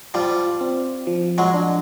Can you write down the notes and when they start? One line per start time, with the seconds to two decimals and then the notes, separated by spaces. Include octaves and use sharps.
0.14 F3 G3 F4
0.61 C4
1.07 F3
1.38 F#3 G#3
1.54 D4